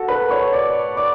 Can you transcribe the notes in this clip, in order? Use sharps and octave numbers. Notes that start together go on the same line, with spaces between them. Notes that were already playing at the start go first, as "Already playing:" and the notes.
Already playing: F#4 A4 A5
B4 B5
C#5 C#6
D5 D6
D5 D6